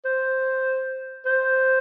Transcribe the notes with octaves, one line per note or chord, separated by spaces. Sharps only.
C5
C5